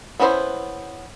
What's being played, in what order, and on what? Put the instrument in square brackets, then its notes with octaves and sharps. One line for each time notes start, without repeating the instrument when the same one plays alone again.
[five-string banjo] B3 C#4 E4 A4 C5